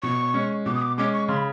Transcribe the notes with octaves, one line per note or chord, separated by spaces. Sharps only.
B2 C#6
G#3 C#4
B2 D6
D#6
D6
G#3 C#4 D6
C#6
C#3 C6
B5